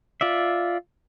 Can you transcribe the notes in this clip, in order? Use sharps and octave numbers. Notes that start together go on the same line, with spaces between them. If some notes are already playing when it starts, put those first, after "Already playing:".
F4 D5 E5